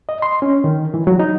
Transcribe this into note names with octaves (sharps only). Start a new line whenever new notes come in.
D#5
C6
C#4
D#3
E3
F#3
D#4